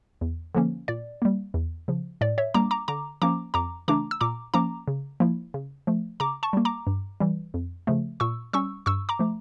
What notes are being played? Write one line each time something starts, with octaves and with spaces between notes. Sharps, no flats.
E2
D3 F3 A#3 C#4
A#2 D5
G3 A#3
E2
C#3 F3
A2 D5
C#5 E5
G3 A#3 D4 A#5 D6
A#5 D6
D3 A#5 D6
F3 A#3 C#4 A#5 D6
F2 A#5 D6
C#3 E3 A3 D4 A#5 D6
E6
A#2 A#5 D6
F3 A#3 C#4 A#5 D6
C#3
F3 A#3 E4
C#3
F3 A3
C#3 A#5 D6
A5 C#6
G3 A#3
A#5 D6
G2
E3 G3
F2
C#3 F3 A3
A#2 C#6 E6
G3 C#4 C#6 E6
G2 C#6 E6
A#5 D6
F3 A3